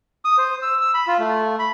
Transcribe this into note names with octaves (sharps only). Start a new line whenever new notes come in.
D#6
C5
E6
E6
B5
F4
A3
B5